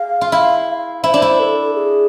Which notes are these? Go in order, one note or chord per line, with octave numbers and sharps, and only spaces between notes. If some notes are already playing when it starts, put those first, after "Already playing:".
Already playing: G#4 F5
F4
E4 F5
F5
E4 C5
D4
E4
A4
G#4